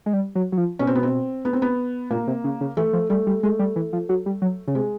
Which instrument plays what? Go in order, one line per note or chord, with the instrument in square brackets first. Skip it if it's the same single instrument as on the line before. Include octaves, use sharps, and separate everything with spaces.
[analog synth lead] G#3
G3
F#3
F#3
F3
[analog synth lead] B2 [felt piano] C#4
[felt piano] C4
B3
C4
B3
C4
B3
[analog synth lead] A#2 [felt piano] A#3
[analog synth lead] C3
C#3
C#3
[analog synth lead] E3 [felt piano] A3
[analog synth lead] F3
[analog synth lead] G3 [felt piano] A3
[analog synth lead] G3
[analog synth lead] G#3 [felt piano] A3
[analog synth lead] G3
E3
F3
F#3
G3
F#3
C#3
[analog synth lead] C3 [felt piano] G#3